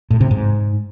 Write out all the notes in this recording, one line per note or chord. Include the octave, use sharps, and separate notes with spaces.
A2
C3
G#2